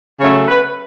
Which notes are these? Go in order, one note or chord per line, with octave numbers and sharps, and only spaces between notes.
C#3 F#3 A3 C#4 C#5
B4